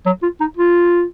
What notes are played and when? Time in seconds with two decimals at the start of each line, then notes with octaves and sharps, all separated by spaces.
0.06 F#3
0.23 F4
0.40 D#4
0.57 F4